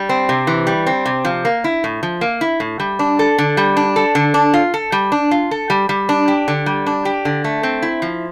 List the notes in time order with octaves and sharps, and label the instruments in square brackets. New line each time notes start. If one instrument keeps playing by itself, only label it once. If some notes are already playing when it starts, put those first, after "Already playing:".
Already playing: [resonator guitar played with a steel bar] G3
C4
C3
E3
G3
C4
C3
F3
A#3
E4
A2
F3
A#3
E4
A2
G3
D4
A4
D3
G3
D4
A4
D3
D4
F4
A4
G3
D4
F4
A4
G3
G3
D4
G4
D3
G3
D4
G4
D3
A3
C4
E4
F3